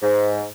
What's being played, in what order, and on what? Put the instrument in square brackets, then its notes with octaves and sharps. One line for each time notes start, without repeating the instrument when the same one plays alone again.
[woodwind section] G#2